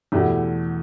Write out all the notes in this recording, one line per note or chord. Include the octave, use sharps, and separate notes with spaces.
E2 B2 A3 E4 G4